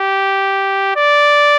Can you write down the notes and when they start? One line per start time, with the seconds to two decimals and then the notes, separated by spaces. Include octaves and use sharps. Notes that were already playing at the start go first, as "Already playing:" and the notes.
Already playing: G4
0.96 D5